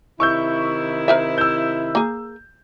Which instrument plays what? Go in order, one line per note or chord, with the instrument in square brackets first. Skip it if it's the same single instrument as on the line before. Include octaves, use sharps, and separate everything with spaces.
[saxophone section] C3 D#3 E4 [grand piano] C#6 E6 G6
[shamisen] A#4 C5 E5
[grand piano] E6 G6
[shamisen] A#3 G#4